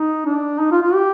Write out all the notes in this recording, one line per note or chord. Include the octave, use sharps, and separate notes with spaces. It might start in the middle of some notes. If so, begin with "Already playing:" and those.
Already playing: D#4
D4
D#4
F4
F4
G4